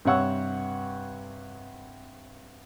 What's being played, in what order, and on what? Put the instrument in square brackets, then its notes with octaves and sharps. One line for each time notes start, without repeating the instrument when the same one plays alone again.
[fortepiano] G2 C3 C#5 F#5 C#6 E6